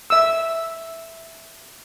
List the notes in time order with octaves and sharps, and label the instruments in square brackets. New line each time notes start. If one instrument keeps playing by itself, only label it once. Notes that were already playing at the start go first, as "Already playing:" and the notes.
[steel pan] E5 E6